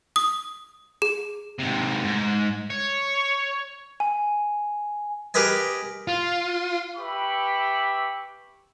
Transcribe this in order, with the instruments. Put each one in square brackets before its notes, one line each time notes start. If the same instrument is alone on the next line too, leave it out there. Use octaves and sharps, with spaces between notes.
[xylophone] D#6
G#4
[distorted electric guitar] G#2 C3
G#2
C#5
[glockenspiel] G#5
[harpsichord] G4 G#4 A#4 B4 D#5 G#5
[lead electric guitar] F4
[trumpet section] G4 B4 E5 B5 C#6 D6